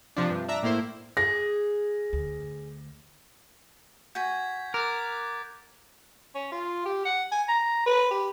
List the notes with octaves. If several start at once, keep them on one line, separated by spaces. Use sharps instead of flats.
C3 F3 D4
G2 C3
D4 E5 A#5
A2 A#3 E4 C5
G#4 A#6
D2
F#4 G#5 G6 G#6 B6
A#4 D6 F#6 A6
C#4
F4
G4
F#5
G#5
A#5
B4
G4